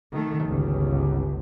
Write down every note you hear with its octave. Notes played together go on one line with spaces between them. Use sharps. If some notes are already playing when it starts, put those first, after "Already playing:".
D#3 A3
G1 C#2